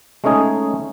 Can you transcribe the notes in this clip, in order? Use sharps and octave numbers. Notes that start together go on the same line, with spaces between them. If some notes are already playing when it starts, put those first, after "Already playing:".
G#3 A3 C#4 D#4 G#4